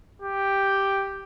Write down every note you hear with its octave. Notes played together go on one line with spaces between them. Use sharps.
G4